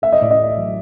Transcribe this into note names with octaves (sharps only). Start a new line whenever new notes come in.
A3 E5
D#5
A2 D5
D#5
A3
F#3